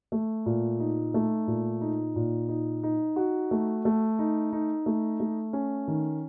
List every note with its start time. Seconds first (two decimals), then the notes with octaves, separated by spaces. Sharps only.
0.12 A3
0.46 A#2
0.80 D#4
1.14 A3
1.47 A#2
1.81 D#4
2.16 A#2
2.49 D#4
2.83 D#4
3.16 F#4
3.51 A3
3.85 A3
4.19 D#4
4.52 D#4
4.86 A3
5.20 A3
5.53 C#4
5.88 D#3